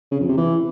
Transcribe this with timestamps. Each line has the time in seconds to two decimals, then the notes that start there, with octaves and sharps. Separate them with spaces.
0.11 C#3
0.20 F2
0.29 C3
0.37 E3